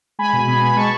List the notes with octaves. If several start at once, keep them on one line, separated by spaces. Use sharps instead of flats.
G#3 G#5 B5
B2
B3 G#5 B5
B3 B5
G#3 A5 C#6